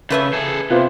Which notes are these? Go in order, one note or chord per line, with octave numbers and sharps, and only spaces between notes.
C#3 A3 B4 E5
G#4 A4
C3 B3 F4 C5 F#6